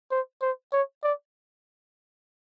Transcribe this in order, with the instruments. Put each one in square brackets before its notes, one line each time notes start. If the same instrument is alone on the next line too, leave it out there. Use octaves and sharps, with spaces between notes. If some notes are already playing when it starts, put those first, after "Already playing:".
[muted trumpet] C5
C5
C#5
D5